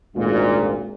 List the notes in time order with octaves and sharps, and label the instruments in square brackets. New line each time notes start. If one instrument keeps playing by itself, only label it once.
[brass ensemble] G#1 D2 G#3 [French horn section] A#2